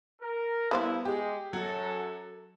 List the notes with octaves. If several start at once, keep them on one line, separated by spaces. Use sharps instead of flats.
A#4
G2 G3 B3 E4 C5 F5
G#3 G4
F#2 F#3 F#4 A4